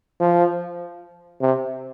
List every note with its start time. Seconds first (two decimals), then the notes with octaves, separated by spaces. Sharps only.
0.20 F3
1.41 C3